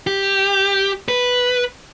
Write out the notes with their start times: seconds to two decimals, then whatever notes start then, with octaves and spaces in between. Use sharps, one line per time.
0.07 G4
1.08 B4